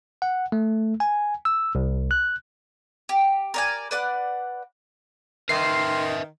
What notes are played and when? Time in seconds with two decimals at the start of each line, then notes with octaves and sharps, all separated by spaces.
0.22 F#5
0.52 A3
1.00 G#5
1.45 E6
1.75 C2
2.11 F#6
3.09 G4
3.54 A#4 D5 G#5
3.91 B4 D5 F#5
5.49 D#3 A#4 B4 E5 C6 C7